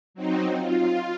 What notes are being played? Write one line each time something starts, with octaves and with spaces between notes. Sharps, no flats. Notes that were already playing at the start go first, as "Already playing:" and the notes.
F#3 C4 D#4
F4